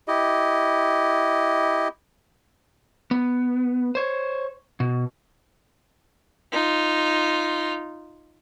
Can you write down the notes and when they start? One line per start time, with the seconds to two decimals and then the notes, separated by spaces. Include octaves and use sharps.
0.08 E4 G4 D#5
3.11 B3
3.95 C5 C#5
4.80 B2
6.52 D#4 F4